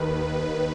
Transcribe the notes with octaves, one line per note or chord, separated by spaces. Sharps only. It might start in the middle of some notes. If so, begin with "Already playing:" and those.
Already playing: D#2 D#3 B4
B4